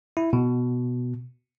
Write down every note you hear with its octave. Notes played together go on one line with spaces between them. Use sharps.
E4
B2